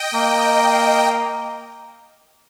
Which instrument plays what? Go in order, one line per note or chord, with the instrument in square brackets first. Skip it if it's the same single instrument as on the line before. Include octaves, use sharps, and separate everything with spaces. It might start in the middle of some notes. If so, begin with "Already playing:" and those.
Already playing: [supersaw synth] D#5 G5
[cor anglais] A#3